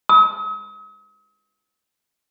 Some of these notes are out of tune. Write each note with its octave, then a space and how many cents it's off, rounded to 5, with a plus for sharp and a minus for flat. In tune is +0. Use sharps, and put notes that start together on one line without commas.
D#6 +45